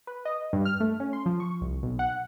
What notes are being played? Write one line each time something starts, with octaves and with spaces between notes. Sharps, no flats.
B4
D#5
G2
F6
A3
C#4
C6
F3
C#6
C2
B1
F#5